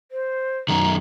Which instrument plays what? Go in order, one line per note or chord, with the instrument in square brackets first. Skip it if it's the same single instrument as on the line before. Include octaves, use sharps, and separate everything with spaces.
[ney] C5
[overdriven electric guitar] F#2 D#3 [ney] A#5